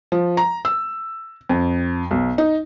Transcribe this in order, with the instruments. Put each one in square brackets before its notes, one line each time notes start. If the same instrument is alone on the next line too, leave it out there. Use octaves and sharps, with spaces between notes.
[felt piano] F3
A#5
E6
F2
B1
D#4